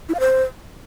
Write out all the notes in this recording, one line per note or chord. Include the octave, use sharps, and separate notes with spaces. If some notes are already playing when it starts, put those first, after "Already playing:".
E4
F5
C5